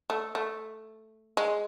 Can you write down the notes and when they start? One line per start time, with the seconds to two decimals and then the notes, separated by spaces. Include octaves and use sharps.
0.10 A3
0.35 A3
1.37 G#3